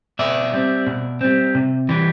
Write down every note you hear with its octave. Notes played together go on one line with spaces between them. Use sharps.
B2 D5 E5
G3 C4
B2
G3 C4
C3
E3 G3